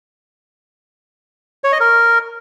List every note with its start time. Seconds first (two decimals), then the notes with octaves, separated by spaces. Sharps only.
1.64 C#5
1.72 D#5
1.80 A#4